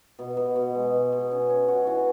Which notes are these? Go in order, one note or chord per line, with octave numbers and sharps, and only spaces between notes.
B2
B2
B2
G#3
B2
B2
C#4
C#4
F#4
E3